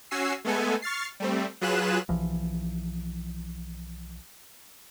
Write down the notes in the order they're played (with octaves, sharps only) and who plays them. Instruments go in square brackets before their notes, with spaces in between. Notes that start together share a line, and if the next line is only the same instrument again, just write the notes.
[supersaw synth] C#4 F#4 G#5 E6 C7
G#3 A3 B3 A4 G#5
C#6 F6 A6 C7
G3 A3 C4
F#3 F4 G#4 B4 F#6 E7
[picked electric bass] B1 E3 F3